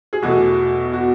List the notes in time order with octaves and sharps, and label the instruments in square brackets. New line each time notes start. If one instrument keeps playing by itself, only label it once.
[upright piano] G#4
E2 B2 A3 F#4
F#4